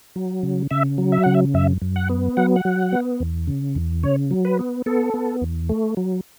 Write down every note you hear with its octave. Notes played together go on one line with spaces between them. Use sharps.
F#3
C#3
C#3 E5
F#3
E5
C#3 F#5
E5
F#2 E5
F#2
F#5
B3
F#3 F#5
F#5
F#3
B3
E2
C#3
E2
C#3 C#5
F#3
B4
B3
B3 A4
B3
E2
A3
F#3